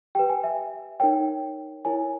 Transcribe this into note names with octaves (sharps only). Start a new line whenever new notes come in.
G4 B4 G5
G#5
E5
D#4 A#4 C#5 G5
E4 A#4 C#5 G#5